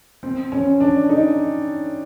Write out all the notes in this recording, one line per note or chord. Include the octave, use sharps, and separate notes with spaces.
C4
C#4
D4
D#4